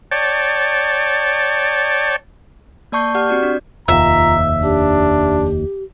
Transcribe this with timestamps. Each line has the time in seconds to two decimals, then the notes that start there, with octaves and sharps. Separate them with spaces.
0.11 C#5 D5 G5 A5
2.92 A#3 D5 A5 C#6 G6 C7
3.15 G4 D5 F#5 C#6 F6
3.28 C4 F#4 D5 G6
3.43 D4
3.88 F1 D#2 F4 E5 A#5
4.63 D4 G4